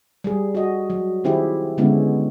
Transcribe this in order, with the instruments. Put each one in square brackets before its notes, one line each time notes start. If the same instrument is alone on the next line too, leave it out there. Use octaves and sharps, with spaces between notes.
[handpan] G3 G#4
F#4 D#5
F#3
D#3 C4 E4 G4 G#4
D3 G#3 B3 C#4 E4